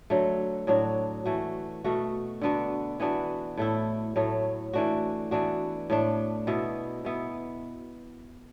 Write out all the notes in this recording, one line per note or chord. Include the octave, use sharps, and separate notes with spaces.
D3 F#3 A3
A2 F#3 D4 F#4
E3 A3 F#4
B2 A3 F#4
D3 B3 D4 F#4
E3 B3 D4 F#4
A2 A3 E4
A2 F#3 A3
E3 A3 D4 F#4
E3 B3 D4 F#4
A2 A3 D4
B2 B3 E4
B2 B3 E4